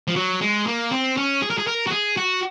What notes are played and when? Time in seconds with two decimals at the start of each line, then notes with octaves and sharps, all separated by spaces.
0.08 F3
0.16 F#3
0.41 G#3
0.67 A#3
0.91 C4
1.17 C#4
1.42 G#4
1.50 A#4
1.58 G#4
1.67 A#4
1.87 F#4
1.92 G#4
2.17 F#4